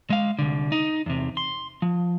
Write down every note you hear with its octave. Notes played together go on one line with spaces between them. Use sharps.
G#3 F5
C2 D3
D#4
E2 C3
C6
F3